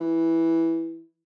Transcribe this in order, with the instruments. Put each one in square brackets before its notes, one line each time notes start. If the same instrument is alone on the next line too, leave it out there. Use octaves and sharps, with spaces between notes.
[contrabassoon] E3